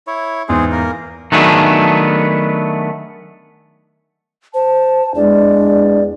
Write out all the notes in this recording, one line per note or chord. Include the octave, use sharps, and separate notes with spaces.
E4 C#5
E2 G#2 C4 G#4 C5
A#3 A#4
D#3 F#3 A3 B3 D4 G#4
C5 A5
E2 G#3 D4 D5